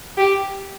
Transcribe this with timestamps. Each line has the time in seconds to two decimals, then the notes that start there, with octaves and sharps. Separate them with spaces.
0.17 G4